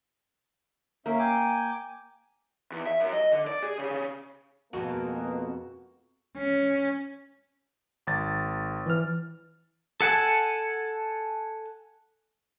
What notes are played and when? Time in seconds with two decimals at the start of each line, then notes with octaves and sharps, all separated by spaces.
1.06 A#3 C#4 E5
1.19 G5 G#5 D6
2.72 E2
2.87 E5
3.00 F#2
3.13 D#5
3.32 D3
3.47 D5
3.63 G#4
3.79 C#3
3.91 C#3
4.73 F2 B2 G#3 A#3 B3 F#4
6.36 C#4
8.07 G#1 A6
8.86 E3 F6
10.01 A4 F#5 G#5 A5